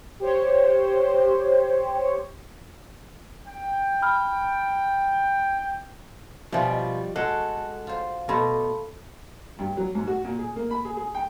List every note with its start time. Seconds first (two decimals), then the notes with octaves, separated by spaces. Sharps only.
0.20 G4 C5 C#5
3.48 G5
4.02 B5 F6
6.52 B2 F3 G3 F4 E5 G#5
6.71 D#5
7.16 G#3 F#4 A4 F#6
7.87 F4 C5
8.29 B2 A3 A5 B5 C6
9.59 G2
9.77 F#3
9.95 G#2
10.07 F#4
10.24 A#2
10.39 G#4
10.56 A#3
10.71 B5
10.85 G#4
10.97 G#4
11.15 G5